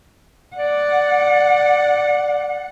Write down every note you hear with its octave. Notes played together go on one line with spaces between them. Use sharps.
D5 F#5